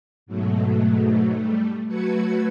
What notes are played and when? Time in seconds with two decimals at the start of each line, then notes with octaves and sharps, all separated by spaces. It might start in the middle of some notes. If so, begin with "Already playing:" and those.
0.26 G#2 B2 F#3 A3
1.33 G3 A3
1.87 F#3 A3 F#4 B4 G#6 C#7